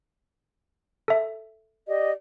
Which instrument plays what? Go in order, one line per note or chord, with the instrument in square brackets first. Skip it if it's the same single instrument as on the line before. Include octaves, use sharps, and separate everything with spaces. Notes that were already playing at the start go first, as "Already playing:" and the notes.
[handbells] A4 E5
[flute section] G4 D5 D#5